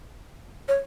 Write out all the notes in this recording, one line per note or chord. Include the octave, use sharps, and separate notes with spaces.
C#5